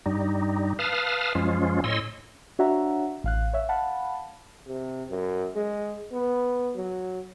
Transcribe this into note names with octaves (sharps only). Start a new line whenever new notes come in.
G2 G3 D#4
B4 F5 A5 D#6 F6
F#2 F3 G#3 C#4 F4
A2 C#5 D#5 C6 E6
D4 F#4 C#5 E5 F#5 A#5
A1 F5 F#6
C#5 E5
F5 F#5 A5 B5
C3
F#2
G#3
B3
F#3